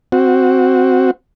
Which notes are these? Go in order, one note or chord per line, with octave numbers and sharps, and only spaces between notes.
C4 F#4